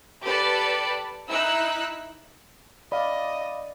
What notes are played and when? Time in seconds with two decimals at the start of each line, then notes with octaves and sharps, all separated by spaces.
0.23 G4 A4 B4 D5 A5
1.29 D#4 E4 E6 F#6
2.92 D5 D#5 F5 B5